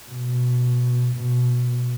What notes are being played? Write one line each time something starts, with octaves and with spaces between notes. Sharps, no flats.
B2
B2